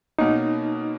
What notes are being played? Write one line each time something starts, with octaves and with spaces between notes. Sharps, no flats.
B2 A#3 C#4 D#4 F#4